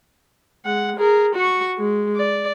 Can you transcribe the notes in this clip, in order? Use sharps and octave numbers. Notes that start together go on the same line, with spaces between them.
G#3 F#5
G#4 A#4
F#4 C#6
G#3
D5